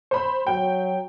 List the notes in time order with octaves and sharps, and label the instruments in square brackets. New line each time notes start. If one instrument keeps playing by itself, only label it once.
[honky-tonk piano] C5 B5
[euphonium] F#3 [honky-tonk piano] G5